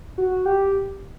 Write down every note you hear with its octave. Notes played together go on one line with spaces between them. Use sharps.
F#4
G4